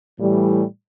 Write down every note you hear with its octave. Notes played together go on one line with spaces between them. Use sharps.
A2 E3 G3